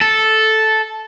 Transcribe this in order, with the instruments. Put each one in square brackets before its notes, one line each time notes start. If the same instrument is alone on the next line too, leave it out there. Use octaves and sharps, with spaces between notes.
[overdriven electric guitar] A4